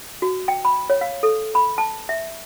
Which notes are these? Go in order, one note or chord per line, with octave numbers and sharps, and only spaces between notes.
F#4
G5
B5
C#5
F5
A4
B5
A5
E5